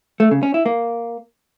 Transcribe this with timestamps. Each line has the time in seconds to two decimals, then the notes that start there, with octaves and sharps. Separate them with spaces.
0.20 A3
0.31 C#3
0.43 C#4
0.54 E4
0.66 A#3